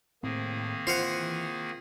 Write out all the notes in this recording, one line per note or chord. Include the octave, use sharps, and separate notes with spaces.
A2 D#3 A#3 C4 G#4
E3 F4 C5 F5 F#5